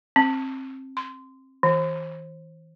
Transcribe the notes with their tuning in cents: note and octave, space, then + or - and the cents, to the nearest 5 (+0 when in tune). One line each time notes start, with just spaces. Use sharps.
C4 +25
C6 -20
E3 -35